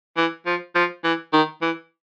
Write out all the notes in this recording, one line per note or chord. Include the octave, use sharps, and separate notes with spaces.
E3
F3
F3
E3
D#3
E3